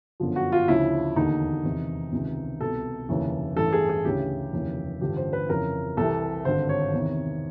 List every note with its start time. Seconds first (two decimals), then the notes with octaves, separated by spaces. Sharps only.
0.20 G1 F#2 D3 F3
0.36 F#4
0.52 F4
0.68 D2 C#3 F3 E4
1.16 E1 D#2 D3 D#4
1.64 E1 E2 C3 D#3
2.12 C#2 C3 D#3
2.60 C2 B2 A4
3.09 F1 D#2 C#3 E3
3.56 A1 G2 E3 A4
3.73 G#4
3.89 G#4
4.05 D2 C#3 E3 G4
4.53 F1 D#2 C#3 E3
5.01 A1 G2 D3 F3 G4
5.17 C5
5.33 B4
5.49 F1 F2 C#3 E3 A#4
5.97 C2 C3 E3 A4
6.45 G#1 G2 D3 C5
6.69 C#5
6.93 E2 C3 D#3